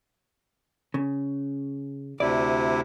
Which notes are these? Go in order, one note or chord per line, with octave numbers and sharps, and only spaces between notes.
C#3
D2 C3 E4 D5